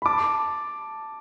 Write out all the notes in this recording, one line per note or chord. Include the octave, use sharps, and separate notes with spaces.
B5
A5 D6